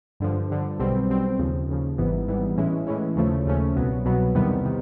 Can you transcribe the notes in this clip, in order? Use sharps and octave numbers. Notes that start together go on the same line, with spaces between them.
G2 D3 F3
G2 D3 F3
B1 B2 G3 C4
B1 B2 G3 C4
D#2 C#3 F3
D#2 C#3 F3
G#1 G#2 E3 G3 B3
G#1 G#2 E3 G3 B3
A2 E3 G#3 C#4 E4
A2 E3 G#3 C#4 E4
D#2 C#3 F3 A3 C#4
D#2 C#3 F3 A3 C#4
C2 B2 F#3 B3
C2 B2 F#3 B3
E2 C3 D#3 G3 B3
C3 D#3